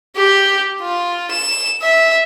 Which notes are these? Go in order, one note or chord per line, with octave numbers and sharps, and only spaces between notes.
G4
F4
E7
E5